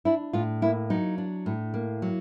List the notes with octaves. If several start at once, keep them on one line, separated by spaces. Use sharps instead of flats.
D4 E4
A2 F4
A#3 E4
F#3 D#4
D4
A2
A#3
F#3